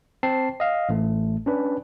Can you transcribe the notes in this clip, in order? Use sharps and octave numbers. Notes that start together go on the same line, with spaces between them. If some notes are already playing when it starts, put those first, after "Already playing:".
C4 A5 C7
D#5 F5
A1 A3
C#4 D4 B4